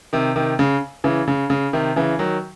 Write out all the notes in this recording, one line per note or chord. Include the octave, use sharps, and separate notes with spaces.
C3 D#3
C3 D#3
C#3
C#3 E3
C#3
C#3
C3 D#3
C#3 E3
D#3 F#3